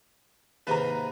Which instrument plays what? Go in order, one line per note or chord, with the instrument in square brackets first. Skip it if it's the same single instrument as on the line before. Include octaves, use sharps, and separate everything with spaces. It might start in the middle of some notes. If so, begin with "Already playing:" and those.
[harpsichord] D#2 G#2 C3 [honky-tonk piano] B4 A#5